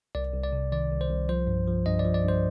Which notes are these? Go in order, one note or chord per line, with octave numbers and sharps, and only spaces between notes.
C2 D5
C2
D5
C3
D#3 D5
C2
C5
C2
F3 C5
G2
F3
G2 D#5
D5
F3
D5
G2
C5